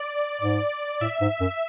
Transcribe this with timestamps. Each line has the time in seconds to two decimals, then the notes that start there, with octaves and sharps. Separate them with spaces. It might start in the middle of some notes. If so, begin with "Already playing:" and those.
Already playing: D5
0.42 G#2 D5
1.01 A2 E5
1.21 G#2
1.41 F#2